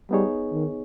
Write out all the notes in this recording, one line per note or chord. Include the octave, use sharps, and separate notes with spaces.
G3 B3 D#4 G#4 C#5
D#3